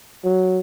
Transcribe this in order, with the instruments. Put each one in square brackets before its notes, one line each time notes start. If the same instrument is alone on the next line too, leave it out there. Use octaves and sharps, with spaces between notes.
[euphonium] F#3